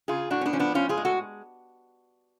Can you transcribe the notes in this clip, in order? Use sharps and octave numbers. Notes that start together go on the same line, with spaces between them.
C#3 F4 G#4
A2 D4 F#4
C#4
B3 D4
F3 C#4
B3 D4
A2 C#4 F4
F4 G#4
G#3
F#4 A4